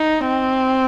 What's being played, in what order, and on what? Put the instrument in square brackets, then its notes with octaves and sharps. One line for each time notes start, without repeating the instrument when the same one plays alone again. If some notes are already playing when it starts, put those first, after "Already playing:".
Already playing: [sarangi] D#4
C4